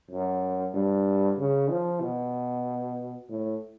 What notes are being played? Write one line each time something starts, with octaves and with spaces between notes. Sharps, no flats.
F#2
G2
C#3
F3
B2
A2